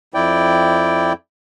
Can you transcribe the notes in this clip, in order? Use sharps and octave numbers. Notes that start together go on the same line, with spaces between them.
F2 E4 D5 G5